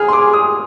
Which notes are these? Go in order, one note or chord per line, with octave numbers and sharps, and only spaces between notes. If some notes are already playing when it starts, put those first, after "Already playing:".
Already playing: G#4 F6
C6
D6
D#6